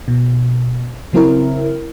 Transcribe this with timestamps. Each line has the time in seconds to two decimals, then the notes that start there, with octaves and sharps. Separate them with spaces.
0.08 B2
1.13 C#3 F#3 C4 E4 A#4